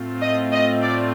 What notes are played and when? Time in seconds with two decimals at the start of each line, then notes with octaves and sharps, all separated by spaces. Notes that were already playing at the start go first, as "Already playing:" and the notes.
Already playing: A2 A3 C4 F4
0.21 D#5
0.52 D#5
0.82 D5